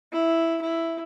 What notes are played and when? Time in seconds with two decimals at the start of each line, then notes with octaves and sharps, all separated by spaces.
0.12 E4
0.62 E4